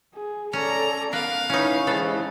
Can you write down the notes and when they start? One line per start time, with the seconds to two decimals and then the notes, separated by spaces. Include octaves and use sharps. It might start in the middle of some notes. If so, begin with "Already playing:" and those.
0.15 G#4
0.53 C#4 A4 D5 A#5
1.13 B3 A#4 B4 F5
1.50 C#4 D#4 E4 B4 C#5
1.87 C3 E3 G#3 B3 E4 A4